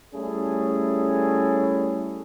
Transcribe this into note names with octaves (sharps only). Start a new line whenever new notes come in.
G3 A3 C#4 E4 G#4 A4